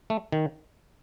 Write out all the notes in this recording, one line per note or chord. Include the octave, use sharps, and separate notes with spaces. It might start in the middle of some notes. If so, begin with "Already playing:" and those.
A3
D#3